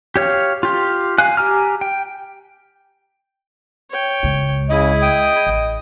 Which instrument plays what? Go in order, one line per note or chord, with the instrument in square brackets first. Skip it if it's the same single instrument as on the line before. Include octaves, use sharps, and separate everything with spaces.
[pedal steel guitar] G4 C#5 F5
F4 G4
F5 G#5 F#6
G4 G#5 A#5 F6
G5
[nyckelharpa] C#5 G5
[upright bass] C#2 G#3
[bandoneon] C#3 [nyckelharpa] E4 G#4 [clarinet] D#5
[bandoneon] G5 D#6
[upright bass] A1